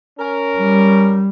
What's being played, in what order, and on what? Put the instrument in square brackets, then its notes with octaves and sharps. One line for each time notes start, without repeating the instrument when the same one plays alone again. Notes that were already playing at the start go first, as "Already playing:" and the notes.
[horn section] C#4 A#4
[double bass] G3